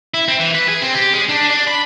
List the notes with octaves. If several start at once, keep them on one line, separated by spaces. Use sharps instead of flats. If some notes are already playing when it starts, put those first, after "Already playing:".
E4
C4
E3
B4
G#4
C4
G4
G#3
D4
D4
B5